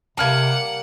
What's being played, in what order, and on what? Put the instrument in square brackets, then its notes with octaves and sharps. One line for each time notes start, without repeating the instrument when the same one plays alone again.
[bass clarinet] C3 [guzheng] G3 A#3 [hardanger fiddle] F#5 [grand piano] A5 F6 G#6